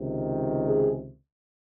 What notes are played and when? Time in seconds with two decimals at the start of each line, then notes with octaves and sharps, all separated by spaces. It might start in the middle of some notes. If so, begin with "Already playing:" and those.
Already playing: C#2 C3 D#3
0.67 G#4